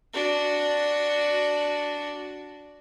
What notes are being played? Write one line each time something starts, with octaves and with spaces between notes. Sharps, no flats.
D4 F#4